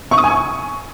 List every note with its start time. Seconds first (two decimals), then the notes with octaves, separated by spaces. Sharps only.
0.11 C#6
0.18 D#6
0.24 G#5
0.30 C#6